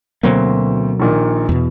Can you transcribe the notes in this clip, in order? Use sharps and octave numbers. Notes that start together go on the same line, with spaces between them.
D2 B2 F#3 A#3 C4
A#1 A#2 D#3
E2 B2